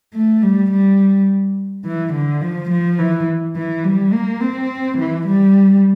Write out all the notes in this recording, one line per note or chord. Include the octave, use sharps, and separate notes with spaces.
A3
G3
G3
E3
D3
F3
F3
E3
E3
G3
A#3
C4
E3
G3